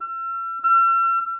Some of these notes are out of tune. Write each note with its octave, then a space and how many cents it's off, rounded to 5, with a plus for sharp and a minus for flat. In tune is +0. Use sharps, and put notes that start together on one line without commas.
E6 +40
E6 +45